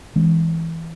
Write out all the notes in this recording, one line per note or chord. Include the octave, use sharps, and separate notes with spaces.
E3 G#3 C#4